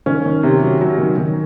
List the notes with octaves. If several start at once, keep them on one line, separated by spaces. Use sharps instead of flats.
D#3 C#4
D#3
C3
F#3
F#3
D#3
D#3